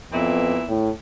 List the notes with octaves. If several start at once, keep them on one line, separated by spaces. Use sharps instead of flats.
F2 A#2 E3 B3 E4
A2